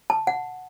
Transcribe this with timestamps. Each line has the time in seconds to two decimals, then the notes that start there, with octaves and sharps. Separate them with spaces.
0.10 A5
0.27 F#5